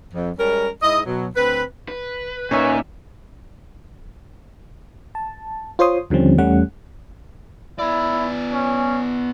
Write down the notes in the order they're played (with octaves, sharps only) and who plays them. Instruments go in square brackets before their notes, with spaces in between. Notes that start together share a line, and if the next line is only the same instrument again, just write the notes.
[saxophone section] F2
G3 G#3 C#4 A#4
G#2 E4 D#5
B2 F#3
D2 C4 B4
[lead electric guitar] B4
[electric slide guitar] A#2 G#5 [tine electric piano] C#4 D#4 E5 [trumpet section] C#5
[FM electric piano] A5
F4 C5 C#5 C6 D#6
D#2 D3 F3 G3 C4 C#4
E2 G3 A3 C#4 F#5
[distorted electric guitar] B3 D5 [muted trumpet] E4
[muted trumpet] C#4